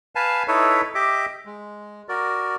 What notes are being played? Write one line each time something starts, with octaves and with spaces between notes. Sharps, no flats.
B4 F5 G#5 A5
D#4 E4 A4 B4 C#5 E5
G4 D#5 E5 D6
G#3
F#4 A#4 D5